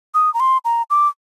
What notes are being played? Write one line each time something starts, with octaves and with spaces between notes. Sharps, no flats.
D#6
A#5
C6
A#5
D6